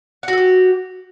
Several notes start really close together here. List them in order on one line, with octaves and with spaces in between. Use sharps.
F#5 F#4 A4 G4